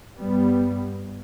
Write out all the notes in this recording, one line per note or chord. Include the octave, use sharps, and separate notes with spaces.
G2 G3 B3